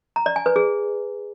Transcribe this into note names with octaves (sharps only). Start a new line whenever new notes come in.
A#5
D5
G#5
B4
G#4